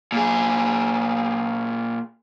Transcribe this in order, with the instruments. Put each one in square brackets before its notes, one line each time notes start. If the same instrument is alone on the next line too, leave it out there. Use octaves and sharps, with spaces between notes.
[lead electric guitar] A#2 G#4